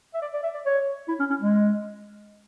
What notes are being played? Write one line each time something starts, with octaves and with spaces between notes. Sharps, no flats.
E5
D5
D5
E5
D5
C#5
E4
C#4
C#4
G#3